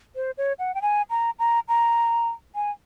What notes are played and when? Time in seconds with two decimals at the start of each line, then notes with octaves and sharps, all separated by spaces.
0.16 C5
0.38 C#5
0.59 F#5
0.75 G5
0.82 G#5
1.10 A#5
1.39 A#5
1.68 A#5
2.55 G#5